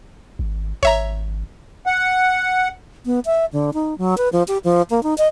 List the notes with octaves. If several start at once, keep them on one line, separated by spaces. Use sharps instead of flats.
G#1
G#1 C#5 E5 A#5
F#5
B3
E5
D3
D#4
F#3
B4
F3
G4
F3
A#3
D#4
D#5